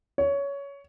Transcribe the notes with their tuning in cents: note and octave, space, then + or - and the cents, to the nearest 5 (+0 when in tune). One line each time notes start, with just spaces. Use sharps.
C#5 +15